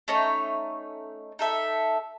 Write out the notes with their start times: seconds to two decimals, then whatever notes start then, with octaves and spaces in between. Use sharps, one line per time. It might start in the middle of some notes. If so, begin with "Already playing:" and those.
0.08 A3 C#4 D#4 C#5
1.39 D#4 A4 E5